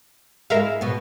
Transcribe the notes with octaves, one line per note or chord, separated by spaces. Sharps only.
G#3 E4 A#4 E5 F5
B2 B3